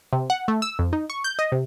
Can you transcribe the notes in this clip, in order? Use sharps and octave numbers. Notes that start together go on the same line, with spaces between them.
C3
F#5
A3
E6
F2
D#4
C#6
G6
D#5
C3